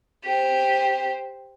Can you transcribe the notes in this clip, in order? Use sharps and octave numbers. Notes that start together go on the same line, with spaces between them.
G4 C5